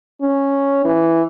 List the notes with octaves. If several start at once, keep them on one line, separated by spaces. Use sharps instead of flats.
C#4
E3